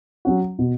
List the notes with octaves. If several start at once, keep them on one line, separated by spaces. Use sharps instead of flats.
F#3 C#4 F#4
B2